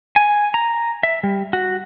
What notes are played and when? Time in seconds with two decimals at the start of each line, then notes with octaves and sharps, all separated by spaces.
0.16 G#5
0.54 A#5
1.03 E5
1.23 G3
1.53 F#4